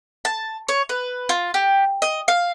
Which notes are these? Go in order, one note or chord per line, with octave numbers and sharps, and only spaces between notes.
A5
C#5
B4
F4
G4
D#5
F5